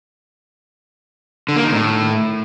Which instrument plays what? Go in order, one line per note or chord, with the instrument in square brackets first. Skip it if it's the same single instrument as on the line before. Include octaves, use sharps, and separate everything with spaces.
[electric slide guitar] D3
A#3
D#3
A2